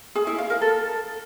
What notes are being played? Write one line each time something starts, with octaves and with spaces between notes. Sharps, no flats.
G#4
E4
F5
A#4
A4